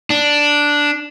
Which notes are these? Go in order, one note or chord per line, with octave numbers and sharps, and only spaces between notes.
D4